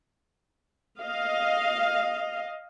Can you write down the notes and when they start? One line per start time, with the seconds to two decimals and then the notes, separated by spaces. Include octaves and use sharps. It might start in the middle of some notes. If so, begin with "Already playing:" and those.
1.01 D#5 F5